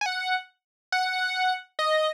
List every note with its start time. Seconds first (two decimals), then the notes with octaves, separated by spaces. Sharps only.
0.01 G#5
0.06 F#5
0.92 F#5
1.79 D#5